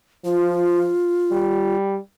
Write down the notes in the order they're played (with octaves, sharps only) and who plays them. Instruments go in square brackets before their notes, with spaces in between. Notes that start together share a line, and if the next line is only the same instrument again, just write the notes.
[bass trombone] F3 [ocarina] F4
[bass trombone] G3